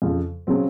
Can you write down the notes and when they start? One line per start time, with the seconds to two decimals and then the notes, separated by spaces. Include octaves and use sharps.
0.02 F2 C#3 F3
0.47 C#3 F#3 C4